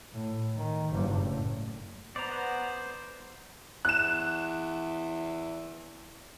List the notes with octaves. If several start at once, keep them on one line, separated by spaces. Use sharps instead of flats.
A2
D#3
F#1 G2
A2
B3 C5 D5 A#5
E2 F#6 E7